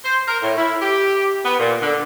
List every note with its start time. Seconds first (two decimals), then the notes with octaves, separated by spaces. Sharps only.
0.04 C5
0.27 A#4
0.43 A2
0.57 E4
0.81 G4
1.44 B3
1.59 A#2
1.81 D3